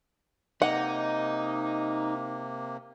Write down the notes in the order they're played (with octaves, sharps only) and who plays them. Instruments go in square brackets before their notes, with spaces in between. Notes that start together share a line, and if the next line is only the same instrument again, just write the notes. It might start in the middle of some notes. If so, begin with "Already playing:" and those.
[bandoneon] C3 A#3 [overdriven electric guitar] D#4 [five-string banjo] F#5